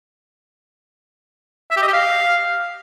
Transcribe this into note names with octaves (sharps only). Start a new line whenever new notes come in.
E5
G4
D#5
G4
F5